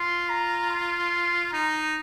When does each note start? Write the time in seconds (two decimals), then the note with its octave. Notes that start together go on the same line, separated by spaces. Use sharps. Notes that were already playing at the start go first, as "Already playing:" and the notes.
Already playing: F4 C6
0.29 A#5
0.70 C6
1.52 D#4 A#5